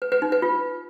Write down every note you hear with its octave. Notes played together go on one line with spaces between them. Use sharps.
B4
B4
D#4
B4
F4